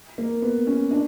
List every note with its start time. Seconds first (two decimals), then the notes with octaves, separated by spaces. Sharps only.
0.18 A#3
0.42 B3
0.67 C#4
0.91 D4